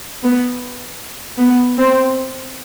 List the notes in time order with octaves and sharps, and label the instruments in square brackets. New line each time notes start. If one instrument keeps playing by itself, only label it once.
[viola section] B3
B3
C4